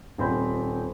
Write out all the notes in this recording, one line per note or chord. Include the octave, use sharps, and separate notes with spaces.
D#1 C4 C5 B5 G6